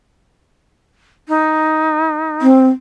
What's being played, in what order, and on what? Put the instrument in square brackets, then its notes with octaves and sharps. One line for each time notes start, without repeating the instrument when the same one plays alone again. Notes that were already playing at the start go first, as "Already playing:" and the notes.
[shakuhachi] D#4
[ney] C4